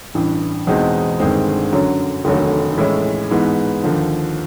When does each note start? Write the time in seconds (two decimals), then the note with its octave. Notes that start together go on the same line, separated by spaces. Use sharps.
0.14 A1 G2 E3
0.67 E2 B2 G#3 C4 D#4
1.20 G1 G2 D#3 G#3 C4
1.73 F#2 D3 F#3
2.25 F1 D#2 D3 F#3 A3
2.78 A2 E3 G#3 C#4 E4
3.31 G#2 E3 G#3 B3
3.84 D#2 D3 F3